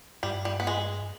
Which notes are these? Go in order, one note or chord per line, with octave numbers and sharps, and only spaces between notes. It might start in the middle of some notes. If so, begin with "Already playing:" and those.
G2 G3
G3
B3
G#3